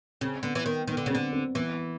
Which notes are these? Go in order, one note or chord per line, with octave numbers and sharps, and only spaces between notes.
C#3 C4
D3 B3
E3
D#3 B3
D#3 B3
D3
C#3
C4
D3
C4
E3 B3